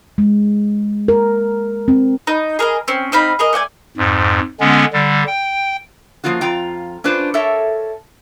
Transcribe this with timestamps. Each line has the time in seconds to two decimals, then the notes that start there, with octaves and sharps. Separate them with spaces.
0.18 G#3
1.08 A#4
1.88 C4
2.27 D#4
2.59 G#4 A#4 C#5 D#5
2.88 C4 C#4
3.12 C4 D#4 F5 B5
3.39 G#4 A#4 D#5
3.53 A3 D5 F#5 G#5
3.97 F2 G#2
4.60 D3 G#3 B3 C#4
4.93 D3 G3
5.27 G5
6.24 F3 A#3 C#4 F4 F#4
6.41 F2 F4 G5 A#5
7.04 C#4 D4 F4 B4 C5
7.34 A4 A#4 C#5 E5 A5